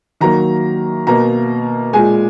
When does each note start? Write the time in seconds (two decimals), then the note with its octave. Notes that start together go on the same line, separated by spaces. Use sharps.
0.20 D#3 F#3 A#3 A#5
1.07 B2 A#3 A#5
1.93 A#2 G#3 G#5